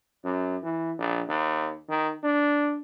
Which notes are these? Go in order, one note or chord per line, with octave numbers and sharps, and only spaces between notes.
F#2
E3
A#1
D#2
D#3
D4